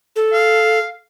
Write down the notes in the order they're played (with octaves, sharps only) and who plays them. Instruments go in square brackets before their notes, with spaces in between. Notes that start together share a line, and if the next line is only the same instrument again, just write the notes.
[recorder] A4
[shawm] F5